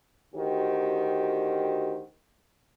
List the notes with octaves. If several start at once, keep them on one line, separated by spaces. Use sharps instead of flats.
D2 D#3 F#4 G4 C5